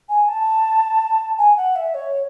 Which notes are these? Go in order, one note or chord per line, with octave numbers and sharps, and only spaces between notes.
G#5
A5
G#5
F#5
E5
C#5